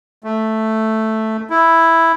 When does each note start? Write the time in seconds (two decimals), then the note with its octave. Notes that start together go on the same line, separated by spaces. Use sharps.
0.24 A3
1.50 E4